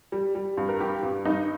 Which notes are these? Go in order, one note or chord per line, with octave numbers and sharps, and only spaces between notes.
G3
G3
G2
A#4
G3 G4
G2
G2 D#4